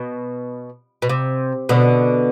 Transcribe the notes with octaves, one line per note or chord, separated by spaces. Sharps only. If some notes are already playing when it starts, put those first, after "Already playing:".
Already playing: B2
B2
C3
B2 D3